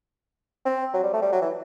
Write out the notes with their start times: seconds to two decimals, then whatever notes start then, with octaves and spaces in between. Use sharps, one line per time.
0.65 C4
0.94 F#3
1.04 G3
1.13 A3
1.22 G3
1.32 F#3
1.41 E3